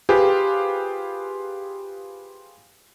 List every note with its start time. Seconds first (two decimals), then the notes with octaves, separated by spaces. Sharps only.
0.09 F4 G4 G#4 B4 C5